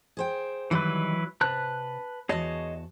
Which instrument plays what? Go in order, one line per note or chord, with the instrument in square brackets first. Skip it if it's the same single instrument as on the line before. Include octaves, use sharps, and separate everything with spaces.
[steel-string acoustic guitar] G#4 C5 G5
[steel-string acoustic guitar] D#3 G3 [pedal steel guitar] E3 F#3 B4
[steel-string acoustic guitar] C3 [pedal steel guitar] B4 A5 F#6
[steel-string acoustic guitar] E2 F#4 A5 [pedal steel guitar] G#4 C#5 D#5